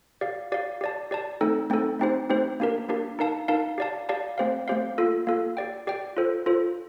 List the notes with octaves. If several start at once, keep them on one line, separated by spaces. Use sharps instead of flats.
G4 D5 F5
G4 D5 F5
G4 D5 A5
G4 D5 A5
A3 C4 D#4 A4
A3 C4 D#4 A4
A3 C4 D#4 G4 C5
A3 C4 D#4 G4 C5
A#3 D4 G4 A#4
A#3 D4 G4 A#4
D#4 A#4 F5 A5
D#4 A#4 F5 A5
G4 D5 F5 A5
G4 D5 F5 A5
A3 C4 G4 C5 F5
A3 C4 G4 C5 F5
A#3 F4 A4
A#3 F4 A4
G4 D5 G5
G4 D5 G5
F4 A4 C5
F4 A4 C5